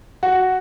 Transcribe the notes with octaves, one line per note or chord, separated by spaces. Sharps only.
F#4